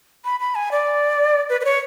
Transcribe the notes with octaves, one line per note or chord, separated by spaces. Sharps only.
B5
B5
G#5
D5
B4
B4
C#5